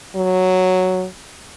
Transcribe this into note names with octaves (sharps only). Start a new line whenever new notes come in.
F#3